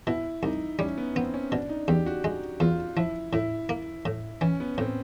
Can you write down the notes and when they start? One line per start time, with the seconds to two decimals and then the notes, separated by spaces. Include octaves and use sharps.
0.07 B2 E4
0.43 C2 D#4
0.79 G3 C#4
0.98 B3
1.16 B3 C4
1.34 C#4
1.51 B2 D4
1.69 D#4
1.88 E2 G4
2.06 F#4
2.24 G#3
2.60 E2 F4
2.96 F3 E4
3.33 A2 E4
3.69 A#3
4.05 A2
4.41 E3 C#4
4.60 B3
4.78 A2 C4